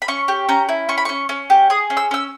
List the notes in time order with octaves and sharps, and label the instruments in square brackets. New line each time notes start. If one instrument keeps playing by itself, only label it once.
[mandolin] B5
C#4 C#6
G4
C#4 A#5
E4
C#4 C#6
B5
C#4 C#6
C#4
G4
G#4 D#6
C#4
E6
C#4 E6